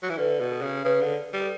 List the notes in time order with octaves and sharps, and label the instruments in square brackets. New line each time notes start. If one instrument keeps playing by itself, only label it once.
[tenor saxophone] F#3
E3
[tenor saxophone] D3 [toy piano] B4
[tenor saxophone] B2
[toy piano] A4
[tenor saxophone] C#3
[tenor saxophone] C#3 [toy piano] B4
[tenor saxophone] D3
G3
[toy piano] A4